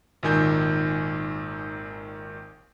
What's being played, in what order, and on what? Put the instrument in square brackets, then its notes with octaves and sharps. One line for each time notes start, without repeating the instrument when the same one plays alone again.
[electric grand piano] G#1 A#2 D#3 G#5 G6